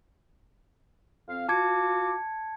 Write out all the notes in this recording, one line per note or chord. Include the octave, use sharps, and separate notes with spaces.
F2 C4 F5
F4 F#4 A5 D6 G#6 C#7